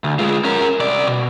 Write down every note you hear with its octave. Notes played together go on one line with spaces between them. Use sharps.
D2
G#3 F4
C#4 A#4
C2 D5
B2